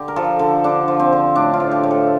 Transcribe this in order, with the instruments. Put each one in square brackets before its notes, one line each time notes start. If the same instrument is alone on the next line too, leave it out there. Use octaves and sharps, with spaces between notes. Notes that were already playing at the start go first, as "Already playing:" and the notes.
Already playing: [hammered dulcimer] D3 G4
A#4
F3 A4
D3 A4
D3 D4
F3
C4
D3
A2 D4
F4
F3
G4
A2
A4